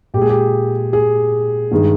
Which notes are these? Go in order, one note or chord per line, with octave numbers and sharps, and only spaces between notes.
A#2 G#3 G4 G#4
G4
G#4
G2 D#3 G#3